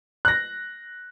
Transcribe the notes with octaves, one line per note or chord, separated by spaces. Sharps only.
F#6 A#6